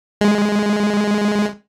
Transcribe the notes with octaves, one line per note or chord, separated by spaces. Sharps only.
G#3